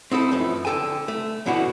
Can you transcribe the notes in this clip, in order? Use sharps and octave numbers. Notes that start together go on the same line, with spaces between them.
C4 D#4 E4 A4
F#2 E3 F3 A3
D3 A4 G5 G#5
A3
F#2 B2 D3 E3 E4 F#4